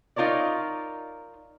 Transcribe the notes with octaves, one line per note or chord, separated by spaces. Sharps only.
D#4 F4 A#4 C#5 D5